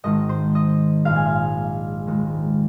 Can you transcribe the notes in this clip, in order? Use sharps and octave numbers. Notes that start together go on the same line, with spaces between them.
G#1 G#2 D#3 D#5
C5
D#5
A#1 G#2 G#3 F5
G#5
F5
D#2 D#3 G#3